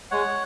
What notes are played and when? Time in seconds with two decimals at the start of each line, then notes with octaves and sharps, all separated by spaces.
0.11 G#3 C#5 F#5